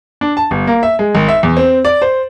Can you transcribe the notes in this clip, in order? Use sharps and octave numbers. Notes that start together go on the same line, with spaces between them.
D4
A5
G1
A#3
E5
G#3
G#1
E5
E2
C4
D5
C5